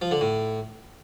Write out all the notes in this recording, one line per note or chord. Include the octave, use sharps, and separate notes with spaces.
F3
D3
A2